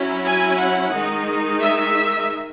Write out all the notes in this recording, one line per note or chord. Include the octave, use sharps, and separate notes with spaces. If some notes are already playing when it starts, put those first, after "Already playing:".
Already playing: F#3 C#4 E4
G#5
F#5
D#3 G#3 D#4
E5